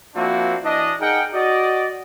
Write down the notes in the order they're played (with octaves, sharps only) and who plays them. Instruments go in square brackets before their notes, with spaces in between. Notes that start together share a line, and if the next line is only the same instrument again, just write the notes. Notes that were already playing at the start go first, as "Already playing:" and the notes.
[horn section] F3 A#3 C4 D4 E4 F#4
E3 D4 D#5
D#4 G#4 A#4 F#5 G5
F#4 D5 D#5